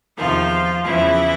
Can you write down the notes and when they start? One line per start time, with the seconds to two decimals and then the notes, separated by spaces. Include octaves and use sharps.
0.17 E2 C3 D#3 F3 F4
0.85 E2 C#3 E3 F3 E4